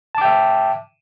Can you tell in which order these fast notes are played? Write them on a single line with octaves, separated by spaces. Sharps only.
A5 D6 G5 E5